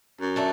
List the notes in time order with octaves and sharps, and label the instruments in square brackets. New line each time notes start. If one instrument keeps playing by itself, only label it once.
[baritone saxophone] F#2
[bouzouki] A3 D4